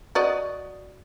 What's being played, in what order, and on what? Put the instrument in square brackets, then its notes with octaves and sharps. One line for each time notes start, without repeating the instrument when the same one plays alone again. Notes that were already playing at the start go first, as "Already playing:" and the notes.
[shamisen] F#4 D5 D#5